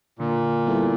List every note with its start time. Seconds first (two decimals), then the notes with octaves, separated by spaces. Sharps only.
0.19 A#2 D3
0.67 G3 B3 E4 A4